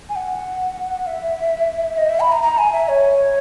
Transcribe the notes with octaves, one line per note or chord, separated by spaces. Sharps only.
G#5
F#5
E5
D#5
E5
B5
A#5
A#5
G#5
E5
C#5